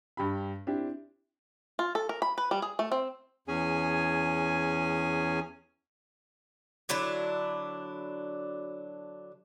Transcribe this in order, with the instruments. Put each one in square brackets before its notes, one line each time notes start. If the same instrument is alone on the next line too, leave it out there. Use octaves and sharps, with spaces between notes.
[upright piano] G2 G4 B5
C4 D4 E4 G4
[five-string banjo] F4
A4
A#4
B5
B4
G3
G#4
A3
C4
[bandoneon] E2 C#4 G#4 G#5
[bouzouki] D3 F#3 D4 E4